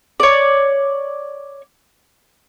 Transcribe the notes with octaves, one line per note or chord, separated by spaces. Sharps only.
C#5 D5